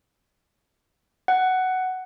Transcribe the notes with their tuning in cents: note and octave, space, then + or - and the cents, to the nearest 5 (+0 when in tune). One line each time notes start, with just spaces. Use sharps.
F#5 +10